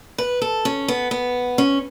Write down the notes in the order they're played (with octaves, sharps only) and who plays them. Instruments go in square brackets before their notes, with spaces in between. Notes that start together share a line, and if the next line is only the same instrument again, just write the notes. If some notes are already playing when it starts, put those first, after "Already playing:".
[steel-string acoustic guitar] B4
A4
C#4
B3
B3
C#4